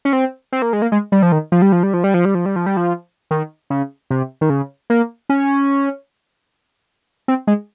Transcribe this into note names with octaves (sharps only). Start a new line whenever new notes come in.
C#4
C4
C4
A#3
G#3
A#3
G#3
G3
F3
D#3
F3
G3
F3
G3
F3
G3
F3
G3
F3
G3
F3
G3
F3
D#3
C#3
C3
D#3
C#3
A#3
C#4
C4
G#3